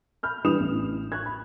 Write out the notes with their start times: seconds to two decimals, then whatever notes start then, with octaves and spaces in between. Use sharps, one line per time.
0.23 B5 F6 G6
0.44 E3 G3 D4 D#6 E7 F7
0.60 A1
1.12 C#6 F#6 G#6
1.26 B5